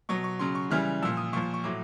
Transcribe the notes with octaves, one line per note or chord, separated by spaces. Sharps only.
B2 F#3 C#6
C#6
C#3 F#3 C6
C#6
C#3 E3 G3 F6
A#2 F3 E6
D#6
A#2 F3 C#6
C#6
A2 F#3 D6